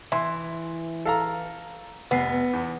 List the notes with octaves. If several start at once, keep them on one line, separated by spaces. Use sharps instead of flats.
E3 E5 C6
A4 F5 A#5
F1 B3 C7
E2